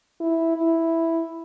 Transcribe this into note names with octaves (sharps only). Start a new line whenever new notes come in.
E4
E4